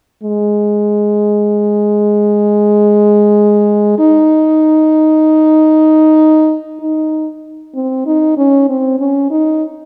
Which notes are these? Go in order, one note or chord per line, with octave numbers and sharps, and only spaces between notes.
G#3
D#4
D#4
C4
D#4
C#4
C4
C#4
D#4